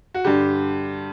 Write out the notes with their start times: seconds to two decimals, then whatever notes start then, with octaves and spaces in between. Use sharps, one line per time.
0.14 F#4
0.24 G2 D3 G4